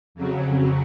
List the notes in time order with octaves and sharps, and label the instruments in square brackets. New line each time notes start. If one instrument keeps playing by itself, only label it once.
[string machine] F2 C#3 F#3